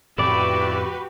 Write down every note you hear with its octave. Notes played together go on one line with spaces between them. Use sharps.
F2 A2 C#3 E4 F#4 G4 B4 D5